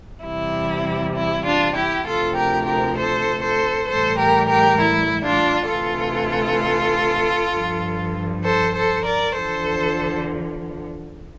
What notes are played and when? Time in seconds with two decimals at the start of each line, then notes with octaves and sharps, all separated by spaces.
0.23 E2 C3 G3 E4
1.15 E4
1.45 D4 F4
1.75 E4 G4
2.06 D2 C3 F3 F4 A4
2.36 G4 A#4
2.66 G4 A#4
2.96 A4 C5
3.43 A4 C5
3.88 A2 E3 G3 A4 C5
4.19 G4 A#4
4.49 G4 A#4
4.80 E4
5.25 D4 F4
5.70 D2 C3 E3 F4 A4
7.53 G2 F3
8.44 A4 C5
8.75 A4 C5
9.05 A#4 D5
9.35 E2 D3 F3 A4 C5